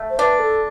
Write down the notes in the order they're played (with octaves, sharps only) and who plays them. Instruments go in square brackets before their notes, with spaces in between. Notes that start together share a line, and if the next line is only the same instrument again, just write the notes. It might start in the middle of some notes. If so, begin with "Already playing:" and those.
Already playing: [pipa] A3
[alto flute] C5
[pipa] D4 [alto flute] B4
[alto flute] A4